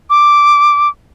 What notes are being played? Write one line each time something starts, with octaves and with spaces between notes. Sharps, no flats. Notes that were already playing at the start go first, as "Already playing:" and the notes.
D6